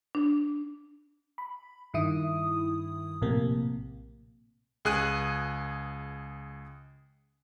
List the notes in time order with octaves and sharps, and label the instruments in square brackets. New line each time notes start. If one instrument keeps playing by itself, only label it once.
[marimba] D4
[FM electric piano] B5
G2 D#3 E4 D#6
A#1 A2 C3 A#3
[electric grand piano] C#2 G#4 F#6 D#7